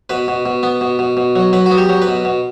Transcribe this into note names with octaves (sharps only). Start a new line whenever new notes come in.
B2 B4
B2
B2
B3
B2
B2
B2
F#3
F#3 B4
F#4
B3
G4
F#3
B4
B2
B2